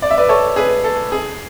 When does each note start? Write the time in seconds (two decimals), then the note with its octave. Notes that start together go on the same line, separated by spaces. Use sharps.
0.02 D5
0.11 E5
0.18 B4 D5
0.29 A4 C#5
0.56 G#4 B4
0.84 A4
1.12 G#4